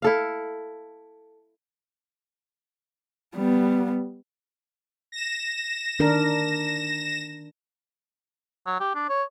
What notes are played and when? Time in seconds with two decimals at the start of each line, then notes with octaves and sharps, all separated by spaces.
0.02 E4 A4 F5
3.36 G3 B3
5.12 A#6 E7
5.99 D#3 D4 A#4
8.66 F#3
8.80 G4
8.95 D4
9.09 C#5